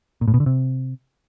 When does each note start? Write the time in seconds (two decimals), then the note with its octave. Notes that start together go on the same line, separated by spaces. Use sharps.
0.21 A#2
0.28 A2
0.34 B2
0.40 D3
0.46 C3